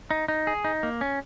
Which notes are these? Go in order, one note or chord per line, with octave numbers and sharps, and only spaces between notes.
D#4
D#4
G#4
D#4
A#3
C#4